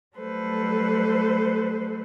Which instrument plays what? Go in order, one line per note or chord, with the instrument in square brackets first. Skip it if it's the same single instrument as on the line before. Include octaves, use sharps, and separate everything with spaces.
[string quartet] F#3 G3 A3 A4 B4 C5